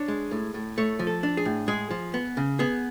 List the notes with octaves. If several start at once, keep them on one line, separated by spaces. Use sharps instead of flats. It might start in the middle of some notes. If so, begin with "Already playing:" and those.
Already playing: D4 C#5
G#3
A2
A2
A3 C#5
F3
A4
D4
G#4
A2
G#3 G#4
F3
B3
C#3
B3 G#4